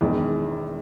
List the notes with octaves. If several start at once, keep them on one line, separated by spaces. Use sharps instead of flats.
E1 E2 D#3 G#3